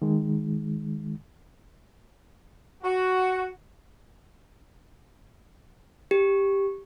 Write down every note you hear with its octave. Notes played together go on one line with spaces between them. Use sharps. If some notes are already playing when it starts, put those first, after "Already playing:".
D#3 G#3
F#4
G4